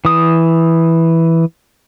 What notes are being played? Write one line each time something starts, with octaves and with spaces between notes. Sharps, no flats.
E3 D#6